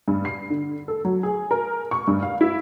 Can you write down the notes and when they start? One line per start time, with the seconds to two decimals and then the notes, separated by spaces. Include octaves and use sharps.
0.08 G2
0.25 C7
0.50 D3
0.88 A4
1.05 F#3
1.23 G#4
1.51 A#4
1.91 C#6
2.08 G2
2.22 F5
2.41 E4